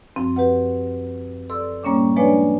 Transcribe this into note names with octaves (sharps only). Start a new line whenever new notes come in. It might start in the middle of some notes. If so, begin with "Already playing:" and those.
F#2 F3 C4
G4 B4 F#5
A4 D5 C6 E6
A2 G3 A#3 C#4 C#5 D6
F3 G#3 D4 B4 C#5 D5